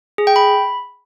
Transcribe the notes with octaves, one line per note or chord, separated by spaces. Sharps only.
G#4
G5
B5